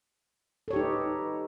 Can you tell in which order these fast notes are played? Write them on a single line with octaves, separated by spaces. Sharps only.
A4 C#5 G4 D#4 B4